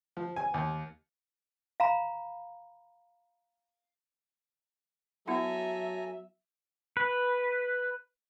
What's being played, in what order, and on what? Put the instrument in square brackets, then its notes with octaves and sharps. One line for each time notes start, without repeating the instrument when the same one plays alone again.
[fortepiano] F3
G#5
D#2
[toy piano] F5 A#5 B5
[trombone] F#3 [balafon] B3 E4 F#5 [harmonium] A4 G#5 A#5 [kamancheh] E5
[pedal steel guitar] B4